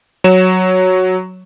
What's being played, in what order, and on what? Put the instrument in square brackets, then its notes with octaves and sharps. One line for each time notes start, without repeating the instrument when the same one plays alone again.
[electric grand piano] F#3 C#5 E7